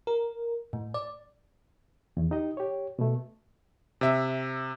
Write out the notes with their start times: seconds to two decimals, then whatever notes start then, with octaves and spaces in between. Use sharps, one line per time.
0.07 A#4
0.73 A2
0.94 D5
2.17 E2
2.31 D#4 G4 D#5
2.57 G4 C#5
2.99 B2 A3
4.01 C3 E5